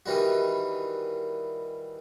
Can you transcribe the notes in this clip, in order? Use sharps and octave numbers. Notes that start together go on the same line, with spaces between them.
D#3 E3 G3 F#4